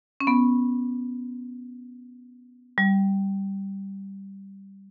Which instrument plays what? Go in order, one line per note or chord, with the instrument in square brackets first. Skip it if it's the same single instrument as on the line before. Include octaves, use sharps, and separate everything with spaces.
[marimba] C#4
B3
G3